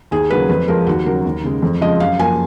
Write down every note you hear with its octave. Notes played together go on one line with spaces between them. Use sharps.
D#2 G#4
C#3 F#3 A#3 B4
F2 B4
F3 G#3 A#4
D#2 F#4
C#3 F#3 A#4
D#2
C#3 G#3
F2
C#3 F3 G#3 D#5
F#2 F5
F3 A#3 G#5